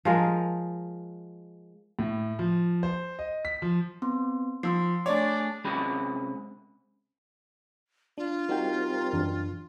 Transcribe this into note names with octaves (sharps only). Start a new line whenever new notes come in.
F3 G#3 A#4
A2
F3
C5
D#5
B6
F3
B3 C4 C6
F3 C6 E6 C7
A3 D4 G#4 C#5 D5 D6
C3 G#3 C#4 G#4 B5
D4 F4
G3 C4 D#4 F#4 A#4 G5
F#2 E3 D4